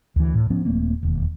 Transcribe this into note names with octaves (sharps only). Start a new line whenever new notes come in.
D2 E3
A2
F3 B3 C#4
D#1 A3 A#3 C4
E1 D#2